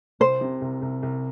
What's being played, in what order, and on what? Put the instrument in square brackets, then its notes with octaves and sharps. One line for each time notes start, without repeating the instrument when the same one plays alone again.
[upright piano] C2 [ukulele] C5
[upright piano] C3
C2
C2
C2